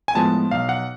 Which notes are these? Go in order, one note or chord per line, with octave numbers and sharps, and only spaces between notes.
G#5
A2 F3 G#3 B3 A5
B1 F5
F#5